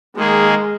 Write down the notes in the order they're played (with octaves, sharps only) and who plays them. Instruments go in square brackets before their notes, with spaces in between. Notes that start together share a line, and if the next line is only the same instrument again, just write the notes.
[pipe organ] D#3 A#3 G#4 [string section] G#3